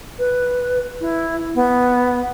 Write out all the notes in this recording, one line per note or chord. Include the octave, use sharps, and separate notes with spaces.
B4
E4
B3